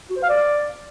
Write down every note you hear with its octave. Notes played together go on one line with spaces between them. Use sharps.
F#4
C5
F5
D5